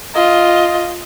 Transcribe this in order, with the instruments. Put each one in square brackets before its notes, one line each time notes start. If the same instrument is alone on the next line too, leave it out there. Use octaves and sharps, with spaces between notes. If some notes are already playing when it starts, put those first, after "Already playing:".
[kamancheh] F4 D#5